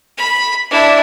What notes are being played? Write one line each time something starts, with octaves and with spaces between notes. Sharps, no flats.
B5
D4 E4